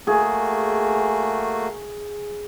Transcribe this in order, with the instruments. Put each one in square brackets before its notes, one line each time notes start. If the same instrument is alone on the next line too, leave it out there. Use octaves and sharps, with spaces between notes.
[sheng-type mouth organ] A3 A#3 F#4 [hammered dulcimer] G#4